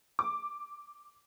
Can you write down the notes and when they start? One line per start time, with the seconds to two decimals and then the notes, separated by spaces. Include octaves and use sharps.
0.19 D6